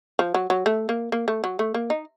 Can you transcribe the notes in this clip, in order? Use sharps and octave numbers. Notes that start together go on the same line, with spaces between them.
F3
F#3
F#3
A3
A#3
A#3
A3
F#3
A3
A#3
D#4